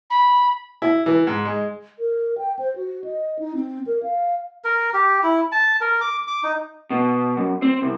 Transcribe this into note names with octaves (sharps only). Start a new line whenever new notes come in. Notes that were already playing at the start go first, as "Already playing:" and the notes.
B5
E4
E3
G#2
G#3
A#4
G5
C5
F#4
D#5
D#4
C4
A#4
F5
A#4
G4
E4
A5
A#4
D6
D6
D#4
B2
F#2
C4
C2